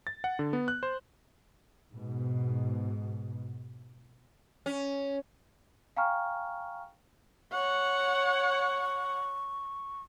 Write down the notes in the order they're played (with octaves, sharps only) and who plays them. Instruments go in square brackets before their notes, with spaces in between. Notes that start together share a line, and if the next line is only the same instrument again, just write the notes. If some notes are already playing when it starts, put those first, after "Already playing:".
[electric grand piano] A6
F#5
D3
B3
F#6
C5
[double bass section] G#2 B2
[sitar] C#4
[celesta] F5 G5 G#5 A#5 C#6 F6
[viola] C#5 F#5 [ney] C#6